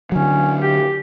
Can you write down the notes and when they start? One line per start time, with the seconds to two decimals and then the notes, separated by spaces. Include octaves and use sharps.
0.12 D3 F#3 C#4
0.60 G4